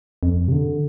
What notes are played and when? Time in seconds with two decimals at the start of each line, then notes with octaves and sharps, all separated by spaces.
0.23 F2
0.48 C3
0.52 D3